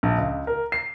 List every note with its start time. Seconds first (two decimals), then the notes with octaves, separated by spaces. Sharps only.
0.03 A#1
0.18 C#2
0.47 A#4
0.72 C7